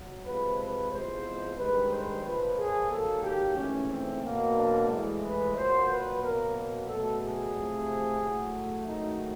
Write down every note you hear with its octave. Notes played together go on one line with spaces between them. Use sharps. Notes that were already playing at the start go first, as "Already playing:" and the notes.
Already playing: F#3
C3 F3 G#3 B4
B4
E2 C3 F3 G#3 C5
G2 D#3 G#3 B4
C5
A#2 F3 A#3 B4
G#4
G#2 D#3 F#3 A#3 A4
G4
G#2 E3 A3 C#4
C4
B2 F#3 A#3
D4
A2 E3 G#3
B4
A#2 F#3 A#3 C5
B4
B2 F#3 A#3 A#4
B2 F#3 A3 A4
G#4
C3 F3 A3
A2 F#3 A3
G#2 D#3 F#3 A3 D#4